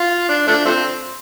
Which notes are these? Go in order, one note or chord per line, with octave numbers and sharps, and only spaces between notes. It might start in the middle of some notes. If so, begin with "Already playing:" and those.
Already playing: F4
D4
F3 A3 D4
F3 A3 C4